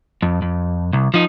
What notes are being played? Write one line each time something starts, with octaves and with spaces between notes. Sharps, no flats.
F2
F2
C2
F3 D#4